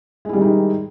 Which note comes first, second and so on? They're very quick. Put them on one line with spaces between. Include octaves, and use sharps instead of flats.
G#3 E4 G3 D#3 D#4